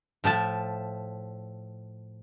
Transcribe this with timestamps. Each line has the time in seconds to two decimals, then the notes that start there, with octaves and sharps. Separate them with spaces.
0.24 A2 F3 E5 A5